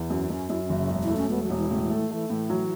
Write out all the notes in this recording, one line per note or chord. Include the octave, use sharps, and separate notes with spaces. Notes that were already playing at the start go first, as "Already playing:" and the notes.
Already playing: E2
F#2 C#4
F#2 C#4
F#2 E4
C#4
F#1
C#3
E1
E4
A3
C#4
E1 B3
F#3
E1
E3
A2 C#3
E3
A3
E3
E3 A3
A2 E3
F#3